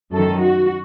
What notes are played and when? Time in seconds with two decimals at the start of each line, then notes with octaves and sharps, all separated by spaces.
0.12 F#2 D#3 A4
0.40 F#4